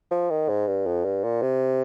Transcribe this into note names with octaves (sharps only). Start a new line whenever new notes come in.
F3
D#3
G#2
G2
F2
G2
A#2
C3